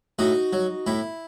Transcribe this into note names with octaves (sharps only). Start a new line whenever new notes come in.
A2 D#4 F#4
F#3
A2 E4